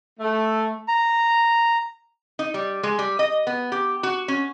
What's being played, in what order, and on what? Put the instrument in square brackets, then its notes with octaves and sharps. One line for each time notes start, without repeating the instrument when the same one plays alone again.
[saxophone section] A3
[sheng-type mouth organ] A#5
[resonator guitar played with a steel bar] D#4
G3
G#3
G3
D#5
B3
G4
F#4
C#4